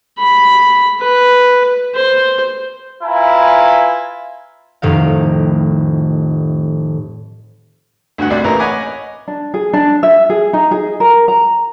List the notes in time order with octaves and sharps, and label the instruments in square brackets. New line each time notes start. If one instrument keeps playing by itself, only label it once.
[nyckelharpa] B5
B4
C5
[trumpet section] E4 F4 B4 G#5 A#5 B5
[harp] F1 A2 D#3 F5
[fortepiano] D2 G2 F#4 F#5
C2 G3 D5
A1 E3 A#3 A#4 A#5
C#5 D#5 F#5 G#5 B5 D6
[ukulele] D4
G#4
D4
E5
G#4
D#4
G#4
A#4
A#5